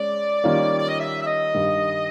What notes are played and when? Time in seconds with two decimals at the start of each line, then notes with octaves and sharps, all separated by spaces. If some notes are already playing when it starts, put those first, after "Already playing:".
Already playing: G#3 C#4 D5
0.44 D#3 G3 A#3 C#4 F4
0.78 D5
0.89 D#5
1.00 E5
1.22 E5
1.26 D#5
1.54 G2 D#3 G3